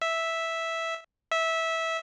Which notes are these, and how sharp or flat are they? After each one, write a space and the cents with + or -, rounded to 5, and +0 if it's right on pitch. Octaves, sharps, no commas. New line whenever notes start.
E5 -5
E5 -15